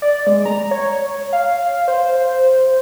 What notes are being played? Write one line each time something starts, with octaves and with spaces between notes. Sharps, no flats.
D5
G#3
A#5
C#5
F5
C5